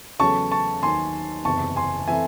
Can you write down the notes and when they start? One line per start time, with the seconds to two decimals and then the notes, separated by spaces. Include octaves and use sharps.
0.19 E2 C#3 F#3 A3 C#4 A5 C#6
0.52 A5 C#6
0.82 D#2 D#3 F#3 G#5 C6
1.45 F#1 E2 C3 A5 C#6
1.76 G#5 C6
2.08 E3 A3 C4 E4 E5 G#5